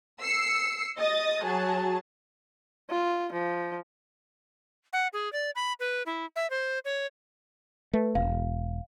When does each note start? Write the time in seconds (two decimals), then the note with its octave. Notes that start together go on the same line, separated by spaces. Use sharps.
0.21 E6 C7 C#7
0.98 D#5 D#6 A6
1.44 F#3 G#4 A5
2.90 F4
3.32 F3
4.93 F#5
5.13 G#4
5.33 D5
5.56 B5
5.80 B4
6.06 E4
6.36 E5
6.50 C5
6.85 C#5
7.93 A3 B4
8.15 E1 F5